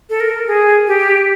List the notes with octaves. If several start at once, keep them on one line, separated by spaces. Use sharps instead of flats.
A4
A#4
G#4
G4